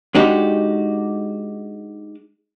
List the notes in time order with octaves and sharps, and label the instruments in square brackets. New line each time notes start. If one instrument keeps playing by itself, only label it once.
[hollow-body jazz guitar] G#3 D4 D#4 F#4 G4